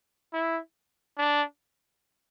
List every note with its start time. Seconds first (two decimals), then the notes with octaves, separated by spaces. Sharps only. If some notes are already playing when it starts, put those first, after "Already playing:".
0.33 E4
1.18 D4